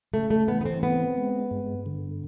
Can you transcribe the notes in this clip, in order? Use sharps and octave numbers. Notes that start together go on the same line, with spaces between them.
C#3 A3
A3
E3 B3
B3
C4
B3 C4
G#3
G2
D3